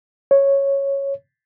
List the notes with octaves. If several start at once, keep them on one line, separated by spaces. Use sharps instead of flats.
C#5